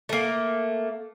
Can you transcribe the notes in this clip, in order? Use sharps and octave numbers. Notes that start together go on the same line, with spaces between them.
A3 A#3